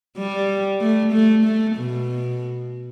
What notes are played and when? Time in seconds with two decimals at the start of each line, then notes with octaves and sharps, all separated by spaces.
0.18 G3
0.81 A3
1.13 A3
1.45 A3
1.76 B2